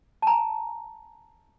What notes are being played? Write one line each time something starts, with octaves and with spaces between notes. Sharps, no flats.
A5
G#5 A#5